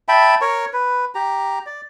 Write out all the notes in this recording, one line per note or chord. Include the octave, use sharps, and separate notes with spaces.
E5 G5 A5 B5
A#4 C#5 C#6
B4
G4 A#5
D5